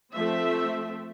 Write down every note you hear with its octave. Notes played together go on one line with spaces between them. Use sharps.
F3 A3 C4 E5